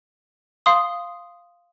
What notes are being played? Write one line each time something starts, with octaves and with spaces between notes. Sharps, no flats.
F5 C6 D#6